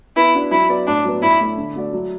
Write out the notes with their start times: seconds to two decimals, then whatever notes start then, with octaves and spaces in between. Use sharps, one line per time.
0.16 B3 E4
0.35 D4 F#4 D5
0.51 F#3 E4
0.69 B3 F#4 D5
0.87 A2 D4
1.05 F#3 B3
1.22 A2 E4
1.40 A3 E4
1.57 D3
1.76 A3 F#4 D5
1.93 F#3